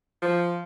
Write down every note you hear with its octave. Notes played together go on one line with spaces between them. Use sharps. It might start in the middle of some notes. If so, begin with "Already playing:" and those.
F3